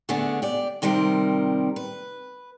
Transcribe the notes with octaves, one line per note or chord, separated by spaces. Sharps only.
D3 A3 B3 D4 G#4
G4 D5
C3 D#3 G3 C4 A#4
B4